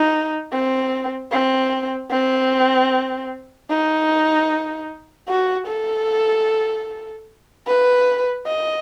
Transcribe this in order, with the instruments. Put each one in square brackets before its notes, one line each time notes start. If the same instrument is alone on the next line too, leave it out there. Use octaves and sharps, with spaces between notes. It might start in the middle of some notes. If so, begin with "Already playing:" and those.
Already playing: [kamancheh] D#4
C4
C4
C4
D#4
F#4
A4
B4
D#5